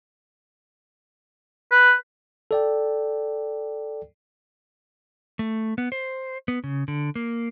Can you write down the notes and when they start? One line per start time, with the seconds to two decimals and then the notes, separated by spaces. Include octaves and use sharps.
1.71 B4
2.51 A4 D5 G5
5.39 A3
5.78 B3
5.92 C5
6.48 B3
6.64 C#3
6.88 D3
7.16 A#3